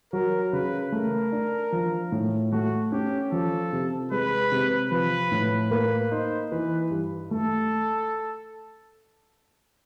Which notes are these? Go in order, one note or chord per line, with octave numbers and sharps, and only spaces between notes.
F#3 A#4
C#3 B4
A3 A#4
D4
F3
A2
A3 F#4
C#4 G4
F3 A4
C3
G#3 B4
C3
F3 B4
A2
A#3 B4
D#4 C5
E3 B4
G2
A3 A4